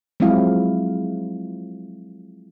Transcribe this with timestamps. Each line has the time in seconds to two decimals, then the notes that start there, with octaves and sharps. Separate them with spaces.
0.20 F3 F#3 G#3 C4 E4 F5